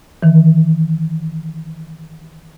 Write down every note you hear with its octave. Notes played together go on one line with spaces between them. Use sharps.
D#3 E3